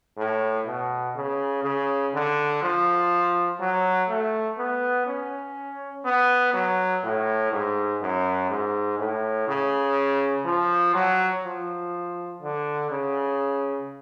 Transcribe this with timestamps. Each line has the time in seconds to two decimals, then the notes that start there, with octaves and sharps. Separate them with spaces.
0.17 A2
0.66 B2
1.15 C#3
1.64 C#3
2.14 D3
2.63 F3
3.60 F#3
4.09 A3
4.58 B3
5.07 C#4
6.05 B3
6.54 F#3
7.03 A2
7.52 G#2
8.01 F#2
8.50 G#2
8.99 A2
9.48 C#3
10.45 F3
10.94 F#3
11.44 F3
12.41 D3
12.91 C#3